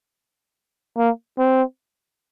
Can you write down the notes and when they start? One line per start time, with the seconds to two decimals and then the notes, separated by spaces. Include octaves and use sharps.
0.98 A#3
1.38 C4